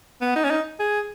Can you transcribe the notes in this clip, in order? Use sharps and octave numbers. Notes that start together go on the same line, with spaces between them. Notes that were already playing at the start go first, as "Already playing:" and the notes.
B3
D#4
C#4
D#4
G#4